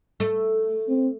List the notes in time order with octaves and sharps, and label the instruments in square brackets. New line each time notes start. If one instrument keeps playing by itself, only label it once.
[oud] A3
[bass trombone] C4